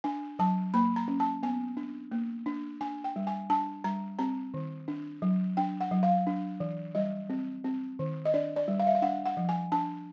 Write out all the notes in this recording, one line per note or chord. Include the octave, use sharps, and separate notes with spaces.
D4 G#5
F#3 A5
A#3 B5
A#5
C#4
A5
B3 G#5
D4
A#3
D4
D4 G#5
G5
G3
G#5
D4 A5
G3 A#5
C4 A#5
D#3
D4
F#3
D4 G5
F#5
F#3
F5
D4
E3
G3 D#5
C4
C4
D#3
D#5
D4 D5
D5
G3
F5
E5
F5
D4 F#5
F#5
F3
G#5
D4 A5